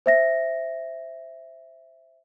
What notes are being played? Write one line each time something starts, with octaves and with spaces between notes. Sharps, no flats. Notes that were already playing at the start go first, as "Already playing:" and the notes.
C5 E5 A#6